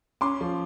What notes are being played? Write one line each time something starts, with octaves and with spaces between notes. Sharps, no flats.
C#4 C6 D6
F3